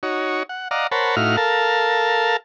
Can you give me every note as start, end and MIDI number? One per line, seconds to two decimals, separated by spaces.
0.03 0.43 63
0.03 0.43 66
0.03 0.43 73
0.49 0.68 78
0.71 0.87 74
0.71 0.87 75
0.71 0.87 77
0.71 0.87 78
0.71 0.87 82
0.92 1.16 70
0.92 1.16 72
0.92 1.16 73
0.92 1.16 78
0.92 1.16 81
0.92 1.16 83
1.16 1.37 45
1.16 1.37 63
1.16 1.37 64
1.16 1.37 66
1.16 1.37 77
1.16 1.37 89
1.37 2.37 69
1.37 2.37 70
1.37 2.37 77
1.37 2.37 81